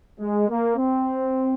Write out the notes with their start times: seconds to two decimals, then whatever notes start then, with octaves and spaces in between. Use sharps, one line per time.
0.19 G#3
0.48 A#3
0.76 C4